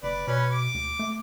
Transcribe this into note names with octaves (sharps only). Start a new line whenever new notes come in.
F#1 B4 D5
B2 C#4 B4
D6
D2
A3